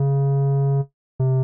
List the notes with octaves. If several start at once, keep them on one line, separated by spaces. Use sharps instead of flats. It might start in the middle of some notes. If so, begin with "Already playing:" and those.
Already playing: C#3
C3